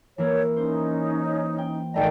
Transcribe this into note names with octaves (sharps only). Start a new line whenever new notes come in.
E3 A#3 E4 C#5
C#4 D#4 C5
G5
G#1 A3 D5 D#5 G5 A#5